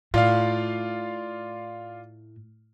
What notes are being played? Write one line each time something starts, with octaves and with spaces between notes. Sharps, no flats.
A2 F4 D5 F5